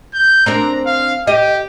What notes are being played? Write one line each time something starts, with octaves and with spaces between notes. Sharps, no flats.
G6
C4 D4 A#4 A#5
F5
G4 D#5